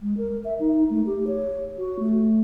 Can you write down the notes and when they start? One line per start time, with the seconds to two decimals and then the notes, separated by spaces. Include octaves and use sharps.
0.01 G#3
0.17 A#4
0.45 E5
0.60 D#4
0.90 A3
1.06 G4
1.27 C#5
1.78 F#4
1.99 A3